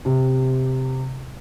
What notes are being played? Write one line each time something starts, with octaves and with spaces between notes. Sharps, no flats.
C3